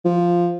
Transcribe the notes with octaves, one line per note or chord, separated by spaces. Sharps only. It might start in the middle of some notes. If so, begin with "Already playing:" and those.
F3